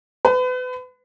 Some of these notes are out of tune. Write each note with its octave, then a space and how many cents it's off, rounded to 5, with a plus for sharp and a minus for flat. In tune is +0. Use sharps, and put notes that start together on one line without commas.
B4 +35